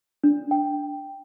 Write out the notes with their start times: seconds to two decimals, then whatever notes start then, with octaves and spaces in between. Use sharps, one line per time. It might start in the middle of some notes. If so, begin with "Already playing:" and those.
0.24 D4
0.51 G5